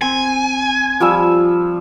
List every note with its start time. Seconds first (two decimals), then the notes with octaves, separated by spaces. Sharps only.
0.01 C4 G#5
1.00 F3 G3 E6